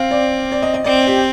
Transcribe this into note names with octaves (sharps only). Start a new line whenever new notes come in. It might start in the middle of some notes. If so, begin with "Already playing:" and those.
Already playing: C4 F5
D5
D5
D#5
D#5
C4 D5
G4